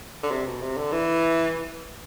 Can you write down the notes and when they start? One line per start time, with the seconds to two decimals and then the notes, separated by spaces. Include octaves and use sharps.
0.23 D3
0.31 C3
0.47 B2
0.61 C3
0.77 D3
0.92 E3